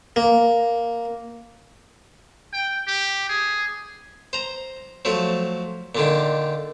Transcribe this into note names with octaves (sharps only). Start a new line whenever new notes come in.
A#3
G5
G4
G#4
C5 A#5
F3 F#3 A3
A#2 D3 D#3